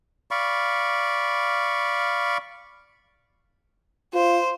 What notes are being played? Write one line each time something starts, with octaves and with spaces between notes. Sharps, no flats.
D5 F5 B5 C#6
F4 C5